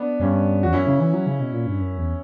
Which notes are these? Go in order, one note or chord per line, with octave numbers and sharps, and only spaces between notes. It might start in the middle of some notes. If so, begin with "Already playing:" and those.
Already playing: B3 D4
G2 C#4
E2 F#4
F#2 C#4 E4
C#3
E3
F#3
C#3
B2
A#2
G2
F#2
E2